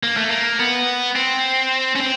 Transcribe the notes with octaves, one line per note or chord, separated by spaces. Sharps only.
A#3
A3
A#3
B3
C4
C#4
C4